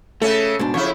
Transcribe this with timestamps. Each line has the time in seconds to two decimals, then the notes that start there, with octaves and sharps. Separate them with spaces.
0.22 C#3 A3 C#4 A4
0.59 G#2 B2 D4
0.74 F2 C#3 E4 C#5